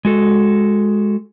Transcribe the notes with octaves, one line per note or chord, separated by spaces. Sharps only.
G#3 F#4 A4